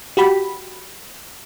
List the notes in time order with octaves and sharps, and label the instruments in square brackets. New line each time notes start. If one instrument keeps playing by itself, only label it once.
[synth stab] F#4 G4 B5